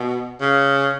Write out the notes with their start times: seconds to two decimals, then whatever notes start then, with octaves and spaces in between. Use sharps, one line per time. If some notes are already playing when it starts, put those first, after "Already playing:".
Already playing: B2
0.41 C#3